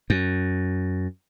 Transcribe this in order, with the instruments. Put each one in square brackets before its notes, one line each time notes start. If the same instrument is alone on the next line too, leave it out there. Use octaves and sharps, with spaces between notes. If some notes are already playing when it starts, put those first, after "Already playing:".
[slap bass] F#2